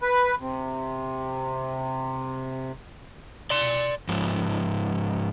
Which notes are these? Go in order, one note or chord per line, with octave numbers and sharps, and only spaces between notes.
B4
C3
D5 C6
G#2 F3